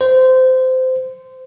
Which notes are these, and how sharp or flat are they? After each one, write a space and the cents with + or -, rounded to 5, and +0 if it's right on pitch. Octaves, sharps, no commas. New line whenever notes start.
C5 -20